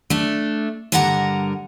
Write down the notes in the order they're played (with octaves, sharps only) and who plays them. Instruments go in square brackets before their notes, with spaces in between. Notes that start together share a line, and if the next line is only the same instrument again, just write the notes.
[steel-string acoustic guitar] A3 D4
G2 D3 A#4 F#5 G#5 A#5